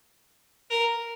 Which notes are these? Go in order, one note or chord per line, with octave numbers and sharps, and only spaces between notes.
A#4